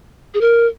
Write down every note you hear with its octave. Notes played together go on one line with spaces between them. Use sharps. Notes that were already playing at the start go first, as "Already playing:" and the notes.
G#4
A#4